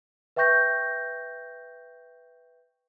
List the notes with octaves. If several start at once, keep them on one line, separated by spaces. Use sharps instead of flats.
B4 E5 G5 C#6 G6 A#6